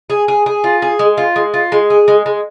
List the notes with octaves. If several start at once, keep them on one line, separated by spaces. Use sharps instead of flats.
G#4
G#4
G#4
F4
G#4
G#3
F4
G#3
F4
G#3
G#4
G#3
G#3